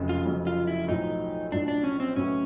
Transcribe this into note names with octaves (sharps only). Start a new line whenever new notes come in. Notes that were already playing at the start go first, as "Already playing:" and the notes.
Already playing: F1 F2 C#3 F#3
F4
F1 F2 C#3 F#3
F4
E4
B1 A2 F3 D#4
B1 A2 F3 D4
D4
C#4
C4
B1 A2 F#3 B3 C#4 E4